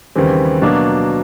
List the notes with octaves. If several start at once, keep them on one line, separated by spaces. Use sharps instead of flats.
D#2 C#3 E3 G3 C4
B2 F#3 A#3 D4